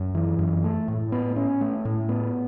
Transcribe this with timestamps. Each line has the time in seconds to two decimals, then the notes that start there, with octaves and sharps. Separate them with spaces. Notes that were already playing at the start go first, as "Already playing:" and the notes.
Already playing: F#2
0.15 E3
0.39 F#2
0.64 A3
0.88 A2
1.12 B3
1.36 C#4
1.61 A3
1.85 A2
2.09 B3